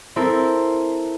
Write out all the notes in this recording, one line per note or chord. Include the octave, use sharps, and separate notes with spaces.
C4 E4 A4 A#4